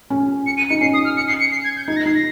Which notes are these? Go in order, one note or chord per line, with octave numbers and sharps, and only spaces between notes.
C#4
C#7
D#7
D#4 C#7
C#4 C7
D#6
F6
C#7
C7
C#7
C7
G#6
G6
D#4 G#6
A#6
D#4 C7
A#6